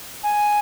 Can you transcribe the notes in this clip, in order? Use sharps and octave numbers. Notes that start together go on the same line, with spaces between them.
G#5